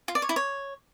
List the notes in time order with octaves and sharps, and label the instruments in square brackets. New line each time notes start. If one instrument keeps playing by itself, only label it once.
[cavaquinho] F4
D5
C#5
E4
C#5